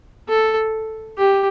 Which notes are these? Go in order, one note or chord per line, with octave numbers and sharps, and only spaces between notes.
A4
G4